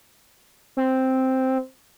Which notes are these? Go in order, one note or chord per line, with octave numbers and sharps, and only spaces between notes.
C4